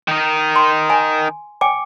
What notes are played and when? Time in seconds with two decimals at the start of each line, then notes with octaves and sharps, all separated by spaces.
0.08 D#3 D#4
0.56 C6
0.90 G#5
1.61 G5 G#5 D6